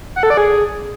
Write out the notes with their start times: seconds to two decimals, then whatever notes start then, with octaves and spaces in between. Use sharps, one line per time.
0.16 F#5
0.23 A4
0.30 D5
0.37 G#4